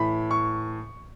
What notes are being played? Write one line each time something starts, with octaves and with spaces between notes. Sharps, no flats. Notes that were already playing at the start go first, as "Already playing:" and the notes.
Already playing: A2 E3 B5
C#6